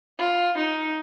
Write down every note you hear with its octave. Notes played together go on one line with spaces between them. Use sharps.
F4
D#4